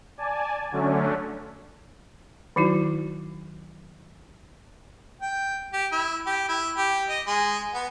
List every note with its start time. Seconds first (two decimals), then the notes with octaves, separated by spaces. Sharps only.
0.18 D5 G#5 A5
0.72 D3 F#3 A3 C#4 D4
2.56 D#3 F#3 D#4 E4 F#4
5.21 G5
5.73 G4
5.92 E4
6.26 G4
6.49 E4
6.77 G4
7.09 D#5
7.27 G#3
7.74 B3